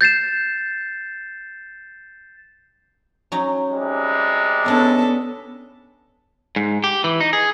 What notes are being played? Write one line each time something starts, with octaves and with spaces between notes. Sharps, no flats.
G6 A6 C7 E7
F#3 C#4 D#4
C3 G3 G#3
B3 C#4 D4 A4 B4
G#2
G4
E3
D#4
G#4